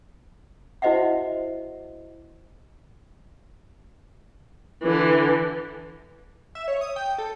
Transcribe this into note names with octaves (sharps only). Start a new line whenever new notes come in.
E4 F#4 C5 D#5 E5 F#5
D3 E3
E5
C#5
D#6
G5
A4